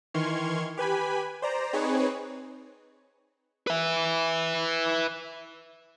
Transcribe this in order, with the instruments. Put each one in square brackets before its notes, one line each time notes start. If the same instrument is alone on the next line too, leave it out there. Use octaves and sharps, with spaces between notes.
[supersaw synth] D#3 E3 C6 C#6 F6 G#6
G4 B4 G#5 B5
C5 D5 A#5
C4 D#4 G#4 B4 C#5
[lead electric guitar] B4 E5